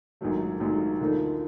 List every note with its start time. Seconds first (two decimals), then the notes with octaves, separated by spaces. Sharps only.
0.21 A#1 G#2 D#3 F#3 A3
0.60 A#1 G#2 D#3 F#3 A3
1.00 D2 D3 F3 A#3 D#4